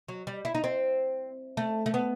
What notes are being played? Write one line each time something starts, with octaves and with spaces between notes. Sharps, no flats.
F#3
G3
E4
D#4
C4
A3
A3
B3